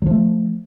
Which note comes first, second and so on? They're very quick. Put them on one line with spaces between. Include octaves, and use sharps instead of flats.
F#3 F3 A3